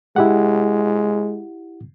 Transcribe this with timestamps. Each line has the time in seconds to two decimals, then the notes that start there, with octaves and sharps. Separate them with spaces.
0.16 G#3 E4 G4 F#5